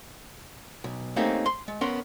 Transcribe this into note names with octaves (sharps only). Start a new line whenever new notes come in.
B1
A3 A#3 C4 C#4 D#4 G4
C6
G#3
B3 C#4 A#4 C6